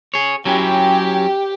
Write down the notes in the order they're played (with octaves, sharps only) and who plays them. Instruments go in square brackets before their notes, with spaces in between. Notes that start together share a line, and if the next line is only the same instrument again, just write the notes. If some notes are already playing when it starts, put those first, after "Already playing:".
[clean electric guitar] G#4 C#5
[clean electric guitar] F#3 C#4 E4 [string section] G4